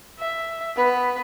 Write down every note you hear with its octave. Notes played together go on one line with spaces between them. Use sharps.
E5
B3 B4